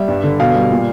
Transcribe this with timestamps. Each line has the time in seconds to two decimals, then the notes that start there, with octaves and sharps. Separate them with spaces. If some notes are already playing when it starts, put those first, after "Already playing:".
Already playing: G3 E5
0.08 G2
0.24 D3
0.40 B2 F5
0.55 G3
0.71 A#2